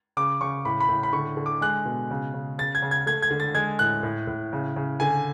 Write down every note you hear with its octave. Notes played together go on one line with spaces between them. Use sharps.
C#3 D6
C#3 C#6
A2 B5
B5
A2
B5
D3 C#6
D3
D6
G#3 F#6
B2
C#3
C#3
C#3 A6
G#6
C#3
G#6
A3 G#6
G#6
D3
A6
G#3 G#6
A2 F#6
A2
A2
C#3
C#3
D3 G#5